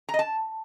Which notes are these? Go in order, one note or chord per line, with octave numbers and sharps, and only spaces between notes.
A#5
D#5
A5